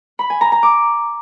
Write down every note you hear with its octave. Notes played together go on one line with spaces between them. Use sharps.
B5
G#5
A#5
A#5
D6